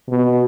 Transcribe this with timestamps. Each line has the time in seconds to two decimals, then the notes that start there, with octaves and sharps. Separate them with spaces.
0.08 B2